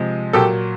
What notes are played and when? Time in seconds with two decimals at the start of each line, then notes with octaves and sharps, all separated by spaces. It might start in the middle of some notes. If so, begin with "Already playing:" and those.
Already playing: C3 F3 G#3
0.33 A#2 F#3 G4 A4